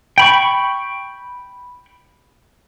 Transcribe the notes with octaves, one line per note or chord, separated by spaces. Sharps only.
G5 B5 C#6